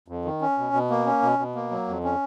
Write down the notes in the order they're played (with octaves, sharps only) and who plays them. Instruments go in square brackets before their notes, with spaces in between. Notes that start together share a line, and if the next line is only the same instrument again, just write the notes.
[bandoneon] F2
D#3
C#4
B2
B2
A#3
C#4
B2
B2
A#3
F#3
F2
C#4